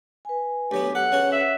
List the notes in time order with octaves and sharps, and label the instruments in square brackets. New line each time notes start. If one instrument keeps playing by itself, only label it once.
[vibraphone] B4 G#5
[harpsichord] D2 F#3 B3 [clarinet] G4
[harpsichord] A4 [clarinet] F#5
[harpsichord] C#3 C#4 F#4 [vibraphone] B4
[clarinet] E5